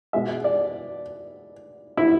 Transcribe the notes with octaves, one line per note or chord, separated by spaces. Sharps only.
B2 G#3 E5
D5
E4